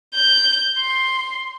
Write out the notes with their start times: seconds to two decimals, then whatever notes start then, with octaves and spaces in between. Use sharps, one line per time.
0.15 G6
0.79 C6